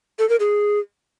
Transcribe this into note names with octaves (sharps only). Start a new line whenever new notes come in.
A4
A#4
G#4